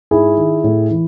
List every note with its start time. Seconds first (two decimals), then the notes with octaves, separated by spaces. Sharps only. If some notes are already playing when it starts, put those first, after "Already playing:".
0.11 G#2 E4 G#4
0.37 D#3
0.64 A2
0.91 E3